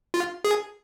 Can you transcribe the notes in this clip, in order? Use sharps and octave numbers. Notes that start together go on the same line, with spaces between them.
F4
G#4